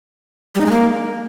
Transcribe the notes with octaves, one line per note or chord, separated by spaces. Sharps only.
G3
D#4
G#3
A#3